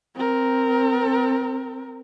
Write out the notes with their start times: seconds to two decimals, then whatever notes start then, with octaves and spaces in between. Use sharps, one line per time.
0.15 C4 A#4